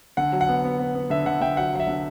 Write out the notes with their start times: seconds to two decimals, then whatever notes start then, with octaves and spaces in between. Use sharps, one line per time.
0.17 D3 F#5
0.32 F#3
0.41 F#5
0.49 B3
0.64 B3
0.80 B3
0.95 B3
1.10 D3 E5
1.26 D3 F#5
1.41 D3 E5 G5
1.57 F#3 F#5
1.73 F#3 F#5
1.80 E5
1.88 D3